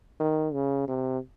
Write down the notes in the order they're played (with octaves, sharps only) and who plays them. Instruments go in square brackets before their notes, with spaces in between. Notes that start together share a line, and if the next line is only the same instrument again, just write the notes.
[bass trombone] D#3
C#3
C3